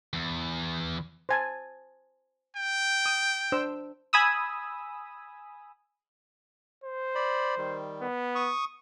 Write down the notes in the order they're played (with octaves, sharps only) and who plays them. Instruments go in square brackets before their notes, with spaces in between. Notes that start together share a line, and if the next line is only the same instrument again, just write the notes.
[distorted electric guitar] E2
[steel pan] C5 G#5 A5
[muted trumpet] G5
[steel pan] D#6
D4 C5 E6
[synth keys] G#5 B5 D#6 E6
[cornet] C5
[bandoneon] D5 B5
D#3 G3
[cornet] B3
[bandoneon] C#6 D#6